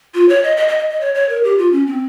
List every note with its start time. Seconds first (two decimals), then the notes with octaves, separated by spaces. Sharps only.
0.14 F4
0.29 C#5
0.43 D#5
0.57 D#5
0.68 D#5
0.79 D#5
0.90 D#5
1.01 C#5
1.15 C#5
1.29 A#4
1.44 G4
1.58 F4
1.72 C#4
1.87 C4